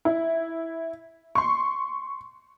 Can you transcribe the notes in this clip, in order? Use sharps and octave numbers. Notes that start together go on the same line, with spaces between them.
E4
C6 C#6